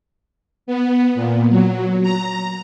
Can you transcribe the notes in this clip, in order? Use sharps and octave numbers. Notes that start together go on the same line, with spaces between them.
B3
A#2
F#3
A#5